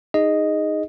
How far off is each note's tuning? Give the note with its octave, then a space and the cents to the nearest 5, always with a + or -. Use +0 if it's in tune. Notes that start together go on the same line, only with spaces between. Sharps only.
D#4 +0 G#4 -15 D#5 +0